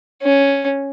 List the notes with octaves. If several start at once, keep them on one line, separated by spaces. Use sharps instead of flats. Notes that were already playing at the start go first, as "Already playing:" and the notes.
C#4